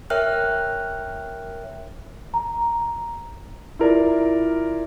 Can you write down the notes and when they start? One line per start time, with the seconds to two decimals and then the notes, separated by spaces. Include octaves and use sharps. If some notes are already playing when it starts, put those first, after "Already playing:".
0.10 A#4 C#5 E5 G5 F6 F#6
2.34 A#5
3.79 E4 F4 A#4 D5